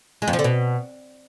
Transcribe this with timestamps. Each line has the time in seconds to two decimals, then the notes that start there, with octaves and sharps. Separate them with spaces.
0.22 G#3
0.28 F2
0.33 F3
0.39 D3
0.44 B2